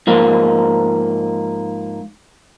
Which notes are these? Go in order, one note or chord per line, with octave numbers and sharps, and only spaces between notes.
G#2 F3 A#3